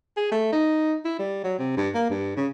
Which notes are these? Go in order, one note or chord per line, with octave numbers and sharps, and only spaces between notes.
G#4
A3
D#4
E4
G3
F#3
C3
G2
A#3
G2
C#3